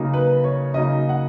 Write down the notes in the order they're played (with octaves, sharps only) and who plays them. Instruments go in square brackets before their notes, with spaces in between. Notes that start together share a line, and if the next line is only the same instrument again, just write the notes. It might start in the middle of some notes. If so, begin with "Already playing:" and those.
Already playing: [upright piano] C#3 F#3 A#3 D#4
B4
C#5
C#3 F#3 A#3 D#4 D#5
F#5